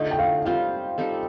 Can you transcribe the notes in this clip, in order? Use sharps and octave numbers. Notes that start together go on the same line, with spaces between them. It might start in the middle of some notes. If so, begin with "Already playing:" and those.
Already playing: D3 A3 D#4 F4 D#5
G5
F5
G3 C4 F4 C5 F5
G3 C4 D#4 A4